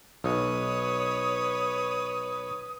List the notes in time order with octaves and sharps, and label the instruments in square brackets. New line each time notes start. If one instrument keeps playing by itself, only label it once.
[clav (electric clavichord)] B1 [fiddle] B4 C#5 [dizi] D#6